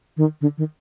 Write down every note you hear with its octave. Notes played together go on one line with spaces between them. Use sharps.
D#3
D3
D#3